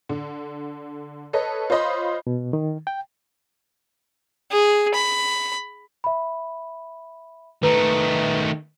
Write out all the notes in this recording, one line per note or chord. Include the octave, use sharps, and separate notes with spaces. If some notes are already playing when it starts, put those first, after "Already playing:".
D3
A4 B4 C#5 D#5
F4 C5 C#5 D#5 B5 C6
B2
D#3
G5
G#4
B5
E5 B5
D#3 A3 B4 A#5